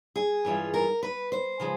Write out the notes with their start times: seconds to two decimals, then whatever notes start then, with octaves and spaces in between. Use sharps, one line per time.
0.16 G#4
0.45 G2 E3 G#3 C#4 F4
0.74 A#4
1.03 B4
1.32 C5
1.60 C#3 F3 G#3